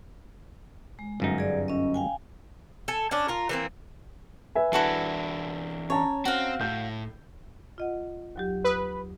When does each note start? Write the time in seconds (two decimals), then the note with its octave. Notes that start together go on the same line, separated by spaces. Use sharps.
0.99 G#3
1.20 G1 F#2 D#4
1.38 G#4 D5
1.68 C#4 D#5
1.94 F5 G5 G#5
2.88 A4 G#5
3.11 C#4 D4
3.28 F4 A#4
3.49 E3 A#3 C4
4.55 B4 E5 G#5
4.73 E3 D4 E4 F#4 A4
5.90 C#4 C#5 A5 A#5
6.25 C4 F#4 F5
6.61 A2 G6
7.78 F4 D#5 F#5
8.36 D#2 F#3 G4
8.64 B4 D#6 E6